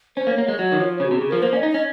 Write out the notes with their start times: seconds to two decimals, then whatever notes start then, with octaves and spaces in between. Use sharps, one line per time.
0.17 C#4 C5
0.27 A#3
0.31 C#5
0.38 A#3
0.45 G#3 C#5
0.59 F#3
0.72 D#3
0.80 F3
1.00 C#3
1.05 F#4
1.11 C3
1.17 C#3 G#4
1.30 F3 A#4
1.42 A#3 C5
1.53 C#4 D#5
1.63 D#4
1.70 C#4 D#5